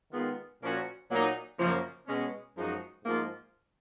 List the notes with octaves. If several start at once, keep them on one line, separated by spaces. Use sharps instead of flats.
D#3 G#3 B3 F4
A#2 F3 A#3 C#4 F#4
A#2 F#3 A#3 D#4
F#2 C#3 F3 A#3
B2 G#3 C#4
F#2 F3 G#3 D#4 F#4
G#2 F3 A#3 F4